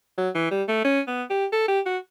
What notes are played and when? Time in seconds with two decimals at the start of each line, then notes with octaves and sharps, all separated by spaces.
0.18 F#3
0.35 E3
0.51 G3
0.68 A3
0.85 C#4
1.07 B3
1.30 G4
1.52 A4
1.68 G4
1.86 F#4